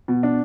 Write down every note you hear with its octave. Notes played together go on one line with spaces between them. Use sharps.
B2
D4